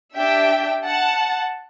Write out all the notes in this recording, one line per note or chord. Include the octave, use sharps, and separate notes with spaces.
D4 G4 E5 G5
F#5 A5